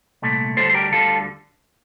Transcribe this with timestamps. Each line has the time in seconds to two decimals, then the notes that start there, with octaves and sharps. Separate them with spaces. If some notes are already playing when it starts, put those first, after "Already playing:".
0.22 C2 A#2 A3
0.57 D2 D3 G3 A4 C5
0.69 C5
0.74 G4 A#4
0.92 D2 D3 G3 F4 A4